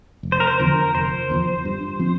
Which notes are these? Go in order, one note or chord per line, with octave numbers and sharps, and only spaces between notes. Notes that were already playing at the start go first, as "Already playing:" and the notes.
F1
C5
A#4
C5
E2 D3 F3 A#4
F1 C5
E2 D3 F3
G2
F3 C4